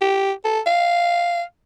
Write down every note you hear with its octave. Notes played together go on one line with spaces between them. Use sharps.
G4
A4
F5